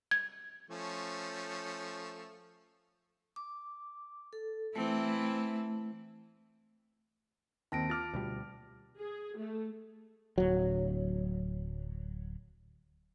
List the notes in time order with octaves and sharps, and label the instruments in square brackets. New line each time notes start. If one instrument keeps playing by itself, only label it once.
[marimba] G#6
[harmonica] F3 A3 C#4
[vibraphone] D6
A4
[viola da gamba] E3 C4 E4 [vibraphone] A3
[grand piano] D#2 C4 [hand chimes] A5 A#6 D7
[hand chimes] F4 [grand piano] D6 F6 A6
[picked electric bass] D2 B2 G3
[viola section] G#4
A3
[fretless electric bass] D1 F#3